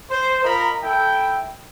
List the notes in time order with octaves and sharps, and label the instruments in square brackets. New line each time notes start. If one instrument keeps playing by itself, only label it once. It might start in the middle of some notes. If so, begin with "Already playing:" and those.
[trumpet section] C5
F4 A#4 D#5 A#5 B5
E4 A4 G5